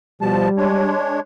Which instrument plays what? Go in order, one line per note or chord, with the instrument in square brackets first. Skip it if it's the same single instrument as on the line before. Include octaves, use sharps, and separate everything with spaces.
[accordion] B2 F3 A5 [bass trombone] G3
[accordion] G#3 D4 C#5